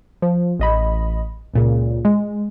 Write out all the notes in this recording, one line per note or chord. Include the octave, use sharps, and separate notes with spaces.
F3
A1 D#5 B5
C#2 A#2 C#3
G#3